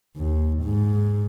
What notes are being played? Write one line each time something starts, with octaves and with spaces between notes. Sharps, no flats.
D#2
G#2